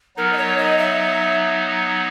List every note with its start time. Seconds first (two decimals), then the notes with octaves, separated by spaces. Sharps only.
0.17 F#3 B3 D#4 A#4
0.33 D#5
0.37 C#5
0.58 D#5
0.79 E5